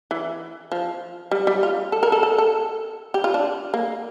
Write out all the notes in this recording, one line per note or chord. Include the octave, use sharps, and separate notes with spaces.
E3
F3
G3
G3
F4
A4
A#4
A4
A4
A4
G4
F4
D4
A#3